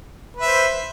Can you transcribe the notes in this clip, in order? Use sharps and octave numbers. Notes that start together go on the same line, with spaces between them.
B4 C5 E5